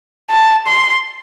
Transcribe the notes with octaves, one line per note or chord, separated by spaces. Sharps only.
A5
C6